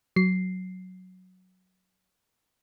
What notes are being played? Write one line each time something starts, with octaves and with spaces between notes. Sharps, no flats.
F#3 C7